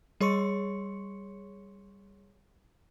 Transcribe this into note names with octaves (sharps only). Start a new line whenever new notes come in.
G3 G#4 C#5 C6 C#6 C#7